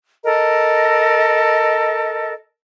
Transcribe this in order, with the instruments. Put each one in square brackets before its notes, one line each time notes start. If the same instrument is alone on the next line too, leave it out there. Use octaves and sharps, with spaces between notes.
[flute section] A4 A#4 D#5